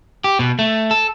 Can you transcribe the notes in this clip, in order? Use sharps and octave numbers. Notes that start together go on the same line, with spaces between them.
G4
B2
A3
A4